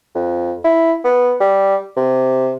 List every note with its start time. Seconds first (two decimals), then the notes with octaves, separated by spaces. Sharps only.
0.15 F2
0.64 E4
1.05 B3
1.40 G3
1.97 C3